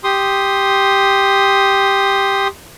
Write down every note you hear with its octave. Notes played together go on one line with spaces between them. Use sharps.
G4 C6 D#6